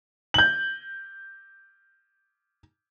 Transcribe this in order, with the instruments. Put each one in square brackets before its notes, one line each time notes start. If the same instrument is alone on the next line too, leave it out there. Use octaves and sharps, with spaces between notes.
[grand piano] G6 F#7